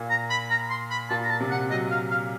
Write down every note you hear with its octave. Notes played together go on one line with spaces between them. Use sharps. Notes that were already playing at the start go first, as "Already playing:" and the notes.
Already playing: A#2
A#5
B5
A#5
C6
B5
A#2 A5
A#5
A5
C3
F#5
F#3 D#5
F5
F5